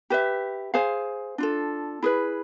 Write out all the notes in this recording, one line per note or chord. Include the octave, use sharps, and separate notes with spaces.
G4 B4 E5
G#4 C5 F5 G#5
D4 F4 A4
E4 G#4 B4